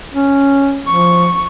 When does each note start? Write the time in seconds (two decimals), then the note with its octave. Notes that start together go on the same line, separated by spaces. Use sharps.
0.14 C#4
0.87 F3 C#6